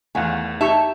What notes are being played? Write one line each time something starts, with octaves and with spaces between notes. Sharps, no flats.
E2 D#3 A3 F5 F#5 G#5
D#4 G4 E5 A5 C#6